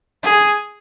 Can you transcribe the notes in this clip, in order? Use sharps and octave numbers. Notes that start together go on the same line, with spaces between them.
G#4